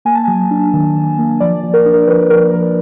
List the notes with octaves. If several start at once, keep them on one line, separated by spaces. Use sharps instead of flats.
A#3 G#5
A5
F#3 G#5
D4
D#3
D#3
A#3
F3 D5
F3
A#4
D4
A#4
F3 B4
F3 A#4
F3 A#4